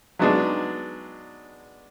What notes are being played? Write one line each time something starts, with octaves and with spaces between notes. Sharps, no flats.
F#3 G#3 B3 D4 D#4 G#4